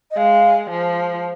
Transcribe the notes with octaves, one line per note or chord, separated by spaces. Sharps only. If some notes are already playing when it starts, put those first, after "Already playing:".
D#5
G#3 F5
F3